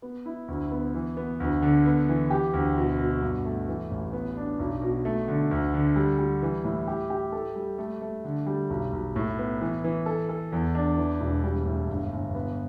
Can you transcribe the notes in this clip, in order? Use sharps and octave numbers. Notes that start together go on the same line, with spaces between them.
B3
E4
D2
B3
E3
B3
D2
D3
B3
E3
G4
D2
B2
B2
G2
A3
E3
A1
B3
D4
B1
B2
A3
D3
D2
D3
G3
G3
E3
A2
G4
G4
A4
G3
A3
A3
D3
G3
B1
B1
A2
B3
E3
E3
A4
A4
E2
D4
E3
E1
G3
A2
G1
G1
B3